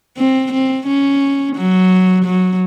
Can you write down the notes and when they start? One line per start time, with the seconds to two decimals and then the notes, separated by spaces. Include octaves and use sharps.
0.17 C4
0.53 C4
0.87 C#4
1.56 F#3
2.25 F#3